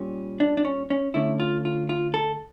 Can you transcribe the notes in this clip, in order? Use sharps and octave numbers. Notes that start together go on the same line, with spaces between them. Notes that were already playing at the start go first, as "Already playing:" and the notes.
Already playing: A#2 G3 C#4
D4
D4
C#4
C#4
D2 D3 A3 C#4 E4
F4
F4
F4
A4